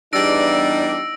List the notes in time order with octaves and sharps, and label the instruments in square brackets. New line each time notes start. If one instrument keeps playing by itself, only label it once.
[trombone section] E2 D#4 [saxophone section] G3 D4 [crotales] E6 A#6 D7